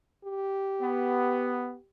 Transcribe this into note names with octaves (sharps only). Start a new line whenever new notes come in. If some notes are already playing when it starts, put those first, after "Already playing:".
G4
B3